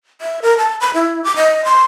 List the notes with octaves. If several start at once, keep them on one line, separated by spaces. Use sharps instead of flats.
E5
A#4
A5
B5
E4
D6
D#5
C6